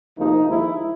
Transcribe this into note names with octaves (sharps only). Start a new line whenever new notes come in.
D2 C3 F3 A#3 D#4
D#2 D3 F3 G#3 E4